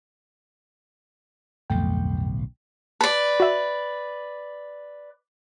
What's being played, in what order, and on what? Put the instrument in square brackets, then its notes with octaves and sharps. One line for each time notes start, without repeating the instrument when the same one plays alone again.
[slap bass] D1 B1 [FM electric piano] F2 A3 G5
[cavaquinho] B4 D5 [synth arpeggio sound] A5
[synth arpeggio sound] F#4 E5